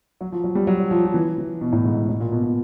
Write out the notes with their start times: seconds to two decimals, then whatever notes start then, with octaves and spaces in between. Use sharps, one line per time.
0.21 F#3
0.32 F3
0.44 F#3
0.55 G3
0.67 F#3
0.91 F3
1.05 F3
1.14 E3
1.38 E3
1.61 B2
1.73 A2
1.85 G#2
1.97 G#2
2.09 A2
2.20 A#2
2.32 B2
2.43 B2